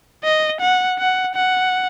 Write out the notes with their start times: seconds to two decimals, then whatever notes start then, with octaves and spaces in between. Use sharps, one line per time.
0.24 D#5
0.61 F#5
0.99 F#5
1.35 F#5